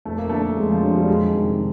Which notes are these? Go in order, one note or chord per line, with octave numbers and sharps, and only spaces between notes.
F2 A3
A#3
D3 A3
F2 G#3
F3
D3 F#3
G3
F2 G#3
C3 D#3